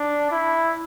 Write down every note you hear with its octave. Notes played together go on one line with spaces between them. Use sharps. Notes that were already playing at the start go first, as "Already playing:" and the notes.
Already playing: D4
E4